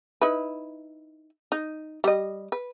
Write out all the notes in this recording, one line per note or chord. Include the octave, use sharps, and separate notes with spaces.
D#4 E4 B4
D#4
G3 D#5
B4